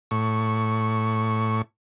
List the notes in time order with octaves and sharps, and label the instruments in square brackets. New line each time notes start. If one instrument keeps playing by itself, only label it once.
[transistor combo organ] A2 C#6